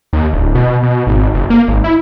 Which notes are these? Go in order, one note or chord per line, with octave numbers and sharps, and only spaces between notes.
D#2
D1
B2
B2
G#1
F#1
A#3
G#1
E4